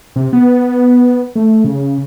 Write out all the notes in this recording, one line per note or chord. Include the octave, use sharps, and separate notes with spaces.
C3
B3
A3
C#3